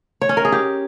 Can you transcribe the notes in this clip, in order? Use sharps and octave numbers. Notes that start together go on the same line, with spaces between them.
C#5
C#4
A#4
G#4
G4